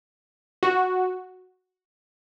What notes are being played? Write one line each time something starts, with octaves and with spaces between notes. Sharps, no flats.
F#4